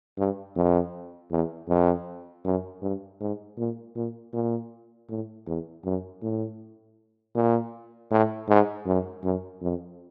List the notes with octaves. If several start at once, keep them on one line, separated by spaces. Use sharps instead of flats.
G2
F2
E2
F2
F#2
G2
G#2
A#2
A#2
A#2
A2
E2
F#2
A2
A#2
A2
G#2
F#2
F#2
F2